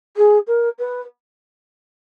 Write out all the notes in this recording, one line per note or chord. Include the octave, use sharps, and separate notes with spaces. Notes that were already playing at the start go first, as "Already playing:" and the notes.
G#4
A#4
B4